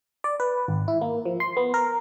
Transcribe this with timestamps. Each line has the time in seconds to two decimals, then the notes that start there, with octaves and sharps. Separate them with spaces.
0.24 D5
0.40 B4
0.68 G#1
0.88 E4
1.01 A#3
1.25 F3
1.40 C6
1.57 B3
1.74 A#4